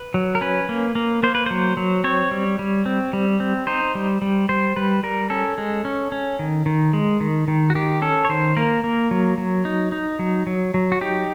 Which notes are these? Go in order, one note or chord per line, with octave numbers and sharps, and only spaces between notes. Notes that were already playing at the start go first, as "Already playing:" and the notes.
Already playing: B4
F#3
A#4
C#4 B4
A#3
A#3
A#3 C5
B4
F#3 C5
F#3
C4 C#5
G3
G3
C4
G3
C4
D#4 C5
G3
G3
G3 C5
G3 B4
G3 A#4
C#4 A4
G#3
C#4
C#4
D#3
D#3
G#3
D#3
D#3
F#4
D#3 G4
C#4 A4
C#5
D#3 C5
A#3 A#4
A#3
F#3
F#3
D#4
D#4
F#3
F#3
F#3
F#4
D#4 G4